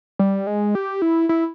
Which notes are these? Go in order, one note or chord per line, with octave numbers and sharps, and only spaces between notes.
G3
G#3
G4
E4
E4